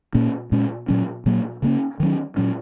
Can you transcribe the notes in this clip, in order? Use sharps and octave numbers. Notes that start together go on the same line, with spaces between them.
A#2 A#3 C#4
A#2 G#3 C#4
A#2 F#3 C#4
A#2 F#3 A#3
C#3 A#3 C#4
D#3 F#3 C#4
A#2 F#3 C#4